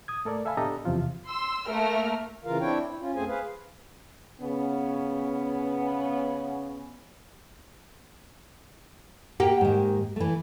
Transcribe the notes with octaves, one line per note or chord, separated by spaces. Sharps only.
D#6 G#6
A3 A4 A#4 D5
A4 E5 F5 G#5 B5
B3 D4 G4 A4 D#5 A#5
E2 C3 F3 F4
C6 E6
A3 A#3 A#4 F6
C#3 E3 F4 A#4 F5
C4 D4 E4 C#5 G5
E4
C#4 F4
F#2 A3 C4 G#4 C5 G#5
G#4 B4 C5 F5
C#3 B3 C#4
A#3 G4 F#5 G5
G#2 D#3
E3 A3